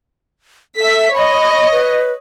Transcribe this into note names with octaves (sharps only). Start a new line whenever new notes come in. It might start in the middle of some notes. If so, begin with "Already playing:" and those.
A4 E5 B6
C#5 D#5 B5
B4